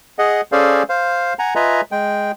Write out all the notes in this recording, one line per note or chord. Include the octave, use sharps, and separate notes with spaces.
G#4 D#5 F#5
C#4 G#4 A4 C5 D5 F5
C5 F5
F#5 G#5 A#5
F4 B4 D#5 E5 G#5 A#5
G#3 G5